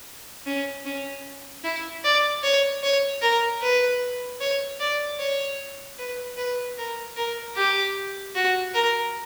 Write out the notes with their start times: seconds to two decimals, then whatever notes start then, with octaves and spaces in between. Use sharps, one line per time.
0.46 C#4
0.85 C#4
1.63 E4
2.04 D5
2.43 C#5
2.83 C#5
3.22 A#4
3.61 B4
4.40 C#5
4.80 D5
5.19 C#5
5.98 B4
6.37 B4
6.77 A#4
7.16 A#4
7.56 G4
8.35 F#4
8.74 A#4